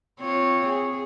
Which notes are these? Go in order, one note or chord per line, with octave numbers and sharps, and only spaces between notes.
C4 F4 C#5
G#4